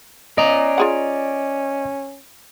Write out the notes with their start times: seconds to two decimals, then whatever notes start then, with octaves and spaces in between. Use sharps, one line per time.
0.38 C#4 D5 D#5 A#5
0.78 F4 G#4 F#5